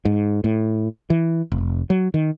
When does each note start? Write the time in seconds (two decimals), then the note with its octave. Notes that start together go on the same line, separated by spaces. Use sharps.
0.05 G#2
0.44 A2
1.10 E3
1.52 F1
1.90 F#3
2.14 D#3